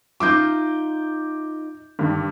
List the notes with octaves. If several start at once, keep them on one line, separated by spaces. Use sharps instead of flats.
D#4 F4 E5 D6 G6
G2 D3 D#3